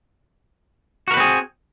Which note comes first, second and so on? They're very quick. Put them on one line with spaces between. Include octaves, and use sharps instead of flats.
F#4 A#4 B4 C4 G#4